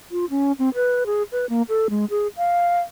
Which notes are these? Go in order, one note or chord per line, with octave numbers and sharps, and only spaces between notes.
F4
C#4
C4
B4
G#4
B4
A#3
A4
G#3
G#4
F5